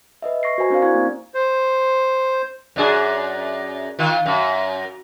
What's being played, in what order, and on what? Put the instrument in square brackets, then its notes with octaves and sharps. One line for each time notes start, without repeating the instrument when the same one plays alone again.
[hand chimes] B4 D#5 E5
C#6 A#6 C7
F#4 A#4 C5 G#5 A#5
C4 D4 C5 D5 F5
E4 F5 A#5 C#6 G#6
A#3 C4
[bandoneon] C5
[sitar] F#2 D4 G#4
D#3 F4
F#2